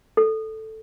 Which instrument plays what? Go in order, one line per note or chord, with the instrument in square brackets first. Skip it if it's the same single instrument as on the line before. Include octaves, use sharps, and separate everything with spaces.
[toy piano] A4